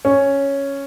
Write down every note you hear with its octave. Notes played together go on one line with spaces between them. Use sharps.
C#4